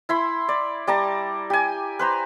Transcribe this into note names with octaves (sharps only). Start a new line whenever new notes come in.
E4 B5 C6
D5
G3 D5 A5 A#5
G4 G#5
B4 C5 A#5